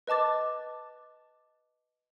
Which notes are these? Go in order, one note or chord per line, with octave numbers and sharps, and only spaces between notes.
B4 D#5 A5 D6 A6